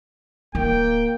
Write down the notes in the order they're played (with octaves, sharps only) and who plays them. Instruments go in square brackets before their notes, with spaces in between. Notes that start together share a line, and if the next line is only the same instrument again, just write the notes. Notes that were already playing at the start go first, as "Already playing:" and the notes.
[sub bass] D1 [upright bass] D#3 [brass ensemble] A#3 [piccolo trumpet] G5